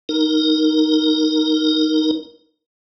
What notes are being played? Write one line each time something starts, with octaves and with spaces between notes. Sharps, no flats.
D#4 A#4